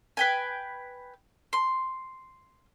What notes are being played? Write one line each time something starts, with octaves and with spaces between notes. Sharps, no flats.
B4 G5 G#5
C6